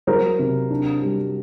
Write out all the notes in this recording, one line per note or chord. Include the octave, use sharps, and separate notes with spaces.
F#3 A#4 C5
C3
D4
G3